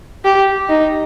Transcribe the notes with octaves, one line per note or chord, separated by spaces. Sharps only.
G4
D#4